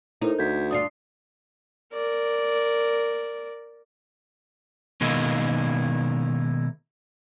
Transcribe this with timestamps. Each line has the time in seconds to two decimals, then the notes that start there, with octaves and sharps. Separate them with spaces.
0.22 A2 D#4 A4 A#4 C5
0.39 D2 G6 G#6 B6
0.71 G2 D4 F4 D#6 C7
1.94 A#4 D5
5.01 B2 D#3 G#3 A#3 D#4 E4